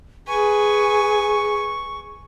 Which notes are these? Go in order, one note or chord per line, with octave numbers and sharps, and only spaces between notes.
G#4 B4 G#5 C#6